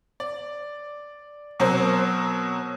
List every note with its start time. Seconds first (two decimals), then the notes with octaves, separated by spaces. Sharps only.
0.20 D5
1.60 B2 F#3 C4 A#4 C5